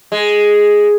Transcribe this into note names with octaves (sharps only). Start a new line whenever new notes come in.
G#3